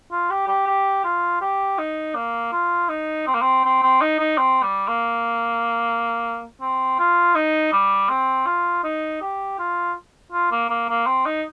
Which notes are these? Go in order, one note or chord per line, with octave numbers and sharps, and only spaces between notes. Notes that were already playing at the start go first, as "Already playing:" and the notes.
F4
G4
G4
G4
F4
G4
D#4
A#3
F4
D#4
C4
A#3
C4
C4
C4
D#4
D#4
C4
G3
A#3
C4
F4
D#4
G3
C4
F4
D#4
G4
F4
F4
A#3
A#3
A#3
C4
D#4